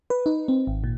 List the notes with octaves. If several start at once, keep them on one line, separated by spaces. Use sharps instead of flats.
B4
D#4
C4
G#1
A#2